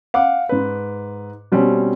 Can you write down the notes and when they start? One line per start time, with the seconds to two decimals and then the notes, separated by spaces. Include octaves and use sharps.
0.14 F5 F#5 D6
0.49 G#2 B4
1.52 B2 G3 C4 C#4